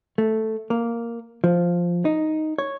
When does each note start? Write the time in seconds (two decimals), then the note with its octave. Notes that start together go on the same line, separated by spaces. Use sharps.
0.18 A3
0.70 A#3
1.44 F3
2.05 D#4
2.58 C#5